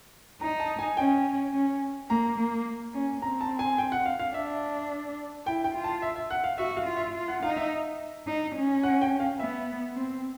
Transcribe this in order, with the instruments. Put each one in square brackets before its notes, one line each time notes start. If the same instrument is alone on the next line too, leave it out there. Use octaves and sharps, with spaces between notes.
[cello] D#4 [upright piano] A#5
[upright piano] A5
G#5
[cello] C#4 [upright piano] G5
[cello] C#4
[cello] A#3 [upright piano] A#5
[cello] A#3
C#4
[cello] C4 [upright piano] A#5
[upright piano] A5
G#5
G5
F#5
F5
F5
[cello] D4 [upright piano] E5
[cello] E4 [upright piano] G5
[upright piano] G5
[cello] F4
[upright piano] A5
E5
E5
F#5
F5
[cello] F#4 [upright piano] E5
[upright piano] F5
[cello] F4
[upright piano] E5
[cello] F4
[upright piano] F#5
[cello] D#4 [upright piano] F5
[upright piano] E5
[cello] D#4
C#4
[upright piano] F#5
G5
F5
[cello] B3 [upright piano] E5
[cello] C4